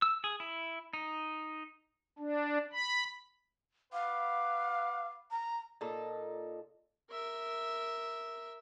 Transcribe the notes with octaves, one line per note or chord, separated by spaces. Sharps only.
E6
G#4
E4
D#4
D4
B5
B4 F5 F#5 D6
A#5
A#2 D#4 A4
A#4 E5